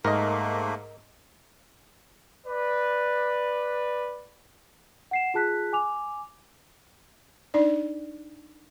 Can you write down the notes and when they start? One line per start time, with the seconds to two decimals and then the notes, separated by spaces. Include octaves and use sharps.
0.05 G#2 A3 A#3 A#4 D#5
2.47 B4 D5
5.11 F#5 C7 E7
5.34 F4 G#4 A5 F#6 B6
5.73 G#5 D6 F7
7.54 D4 D#4 D5